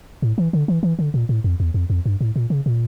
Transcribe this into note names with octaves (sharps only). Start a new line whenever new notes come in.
A2
E3
D3
E3
E3
D3
A#2
A2
F2
E2
F2
F2
G2
A2
A#2
C#3
A#2